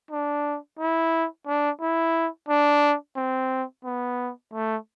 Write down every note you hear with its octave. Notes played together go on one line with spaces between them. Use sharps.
D4
E4
D4
E4
D4
C4
B3
A3